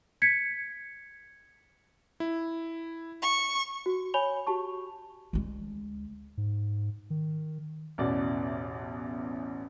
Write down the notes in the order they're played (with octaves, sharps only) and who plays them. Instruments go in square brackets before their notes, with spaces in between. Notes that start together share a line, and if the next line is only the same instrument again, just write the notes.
[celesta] G#6 B6 C#7
[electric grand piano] E4
[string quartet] C#6
[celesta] F#4
C#5 G#5 B5 F7 G7
F#4 G4 A5 C#6
[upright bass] D2 G#3
[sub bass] G#2
D#3
[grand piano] A1 E2 B2 D5